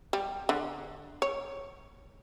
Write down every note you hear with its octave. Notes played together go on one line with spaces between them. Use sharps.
G3
D3
C#5